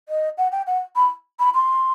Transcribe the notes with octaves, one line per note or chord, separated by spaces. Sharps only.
D#5
F#5
G5
F#5
B5
B5
C6